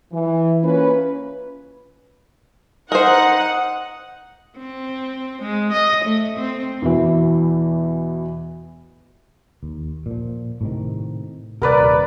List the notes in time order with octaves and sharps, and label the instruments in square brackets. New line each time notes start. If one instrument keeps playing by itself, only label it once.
[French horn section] E3
A#3 C#4 F4 B4
[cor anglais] D#4 [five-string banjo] A#4 C5 [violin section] F#5
[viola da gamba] C4
G#3
D#5
A3
C4
[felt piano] E2 B2 E3
[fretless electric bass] D#2
A#2 F3
A2 C3 D#3
[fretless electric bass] D#1 C3 [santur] A#4 B4 D5